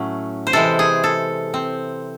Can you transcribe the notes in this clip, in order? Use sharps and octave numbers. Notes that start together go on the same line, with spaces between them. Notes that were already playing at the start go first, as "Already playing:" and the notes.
Already playing: A2 F#3 A3 C#4
C5
C3 E3 G#3 A4
G#4
A4
C4